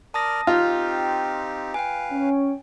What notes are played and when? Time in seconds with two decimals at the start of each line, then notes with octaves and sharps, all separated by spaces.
0.14 A#4 D5 A5 D#6 F6 A#6
0.47 C4 D#4 F4 G4 F6
1.74 B4 F5 G5 G#5
2.12 C#4